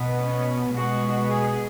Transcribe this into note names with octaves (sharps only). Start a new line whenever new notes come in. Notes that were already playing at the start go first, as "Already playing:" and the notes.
Already playing: B2 B3
C#4
B2 G#3 B3 F#4
G#4